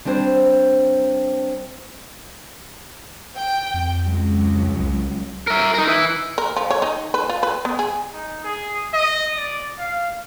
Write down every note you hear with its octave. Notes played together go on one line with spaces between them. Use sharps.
G3 C4 D4 C5 C#5
G5
F2
C#2 F#3
C2
A#4 E5
D#4 A#4
E4 B4
A#4
F3
C#5
D#4
B4
F4
B4
B3
G#4
D#4
G#4
D#5
D5
F5